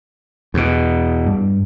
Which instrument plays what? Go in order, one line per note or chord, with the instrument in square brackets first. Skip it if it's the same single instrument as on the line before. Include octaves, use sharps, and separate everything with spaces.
[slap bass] E2 B2
[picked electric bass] G2